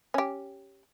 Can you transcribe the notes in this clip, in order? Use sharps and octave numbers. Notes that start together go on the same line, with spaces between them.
C#4 G4